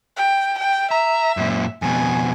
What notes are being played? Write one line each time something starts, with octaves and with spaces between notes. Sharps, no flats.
G5
G5
E5 A#5
F#2 A#2
F2 B2 G#5